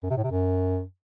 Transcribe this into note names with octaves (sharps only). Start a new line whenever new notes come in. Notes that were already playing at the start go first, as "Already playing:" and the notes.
F#2
C3
A2
C3
F#2